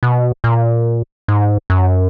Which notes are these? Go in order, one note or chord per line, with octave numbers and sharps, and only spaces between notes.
B2
A#2
G#2
F#2